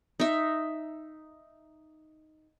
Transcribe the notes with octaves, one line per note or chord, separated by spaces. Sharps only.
D#4 E5